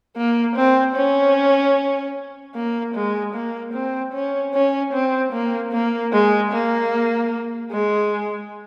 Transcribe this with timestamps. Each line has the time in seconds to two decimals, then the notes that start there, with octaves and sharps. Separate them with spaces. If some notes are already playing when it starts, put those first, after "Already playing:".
0.17 A#3
0.56 C4
0.96 C#4
2.55 A#3
2.95 G#3
3.34 A#3
3.74 C4
4.13 C#4
4.54 C#4
4.93 C4
5.33 A#3
5.72 A#3
6.12 G#3
6.52 A#3
7.71 G#3